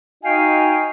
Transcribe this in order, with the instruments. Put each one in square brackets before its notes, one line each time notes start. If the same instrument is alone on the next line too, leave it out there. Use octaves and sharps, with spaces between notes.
[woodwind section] D#4 F#4 D#5 F5 G5 G#5